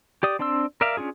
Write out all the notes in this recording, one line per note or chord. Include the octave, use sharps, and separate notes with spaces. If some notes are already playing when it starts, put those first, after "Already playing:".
G4 D5 D#6
C4 D4 D5 C6 E6
A#4 D5 E5 F5
C#4 D4 F4 G#4